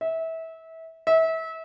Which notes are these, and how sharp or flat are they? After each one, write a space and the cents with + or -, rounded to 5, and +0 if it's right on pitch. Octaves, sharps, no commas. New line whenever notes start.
E5 -25
E5 -30